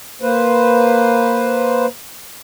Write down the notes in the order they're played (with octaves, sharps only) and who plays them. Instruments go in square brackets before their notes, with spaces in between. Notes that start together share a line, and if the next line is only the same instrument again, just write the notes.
[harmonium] A#3 B4 C5